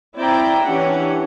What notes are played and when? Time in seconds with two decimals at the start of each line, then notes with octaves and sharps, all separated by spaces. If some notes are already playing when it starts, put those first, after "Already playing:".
0.17 C4 E4 D5 E5 G5 A#5
0.64 E3 C#4 D4 G4 F#5